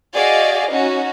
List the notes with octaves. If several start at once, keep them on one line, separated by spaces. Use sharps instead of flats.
F#4 G#4 D5 D#5 F5
C#4 D#4 F#4